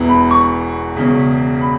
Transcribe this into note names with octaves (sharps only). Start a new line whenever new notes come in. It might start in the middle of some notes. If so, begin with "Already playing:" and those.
Already playing: E1 E2 E3
B5
C#6
E1 E2 C#3
B5